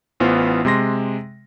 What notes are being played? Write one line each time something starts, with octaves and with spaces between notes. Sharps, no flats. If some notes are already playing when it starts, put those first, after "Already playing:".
A1 E3 B3 F4 C5
C3 G#3 C6 A#6